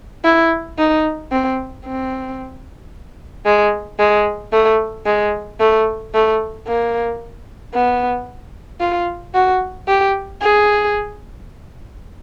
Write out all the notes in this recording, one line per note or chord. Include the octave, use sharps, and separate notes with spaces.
E4
D#4
C4
C4
G#3
G#3
A3
G#3
A3
A3
A#3
B3
F4
F#4
G4
G#4